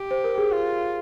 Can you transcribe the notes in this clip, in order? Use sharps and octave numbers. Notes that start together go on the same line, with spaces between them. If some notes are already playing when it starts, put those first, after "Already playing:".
Already playing: G4
C5
A#4
G#4
F4